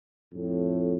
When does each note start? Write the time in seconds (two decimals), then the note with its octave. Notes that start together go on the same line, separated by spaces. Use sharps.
0.33 F2 A2